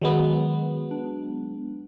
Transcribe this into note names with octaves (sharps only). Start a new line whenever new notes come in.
D#3 F#3 G#3 B3
D4